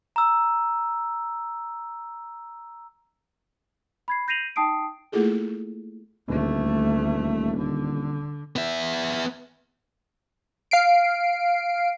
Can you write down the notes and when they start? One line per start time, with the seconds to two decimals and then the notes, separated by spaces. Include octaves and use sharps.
0.16 A#5 E6
4.08 B5 G#6 C7
4.28 G6 A#6 C7 D#7 F7 F#7
4.56 D#4 G5 A5 D#6 C7 D7
5.12 A3 A#3 E4 F4 G#4 A4
6.28 D#1 D2 A3
7.58 D3
8.56 B3 E5
10.71 F5 C7 D7